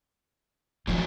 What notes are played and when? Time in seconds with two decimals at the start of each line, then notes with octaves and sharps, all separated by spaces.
0.87 A#2 D#3 F3 F#3 C4